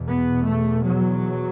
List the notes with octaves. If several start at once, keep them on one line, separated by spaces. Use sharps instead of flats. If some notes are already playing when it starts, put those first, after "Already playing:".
Already playing: E2 B2
B3
A3
F#3